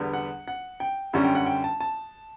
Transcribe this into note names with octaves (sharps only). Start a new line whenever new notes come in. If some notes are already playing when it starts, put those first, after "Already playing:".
Already playing: E2 D3 G3 B3
F#5
F#5
G5
F#2 D3 G3 C#4
G5
F#5
G5
A5
A5